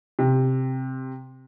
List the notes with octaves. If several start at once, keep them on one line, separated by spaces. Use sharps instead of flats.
C3